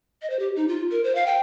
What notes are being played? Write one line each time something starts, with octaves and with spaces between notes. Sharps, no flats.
D#5
C5
G4
D#4
F4
A#4
C5
F5
G5